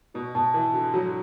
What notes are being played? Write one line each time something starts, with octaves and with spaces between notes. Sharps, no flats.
B2 F#4
B2 A5
E3 A5
D3 F#4
F#3 F#4